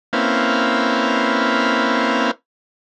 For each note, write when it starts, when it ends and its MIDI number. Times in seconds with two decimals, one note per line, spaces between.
0.13 2.31 58
0.13 2.31 60
0.13 2.31 61
0.13 2.31 64
0.13 2.31 71
0.13 2.31 77